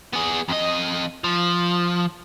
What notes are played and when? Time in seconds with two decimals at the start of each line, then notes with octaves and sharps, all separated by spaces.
0.13 B3 G#4
0.49 F2 D#5
1.24 F3